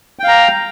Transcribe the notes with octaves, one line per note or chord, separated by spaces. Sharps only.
F5 G5 A#5